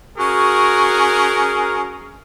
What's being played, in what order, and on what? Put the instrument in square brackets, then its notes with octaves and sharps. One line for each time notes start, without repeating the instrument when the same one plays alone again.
[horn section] C#4 F#4 G#4 A#4